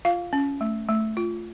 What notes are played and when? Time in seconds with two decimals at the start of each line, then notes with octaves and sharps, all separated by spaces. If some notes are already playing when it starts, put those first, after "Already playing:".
0.05 F4 F5
0.33 C#4
0.61 A3
0.88 A3
1.17 F4